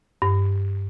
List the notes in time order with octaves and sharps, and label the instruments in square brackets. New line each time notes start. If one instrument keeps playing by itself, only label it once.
[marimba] G2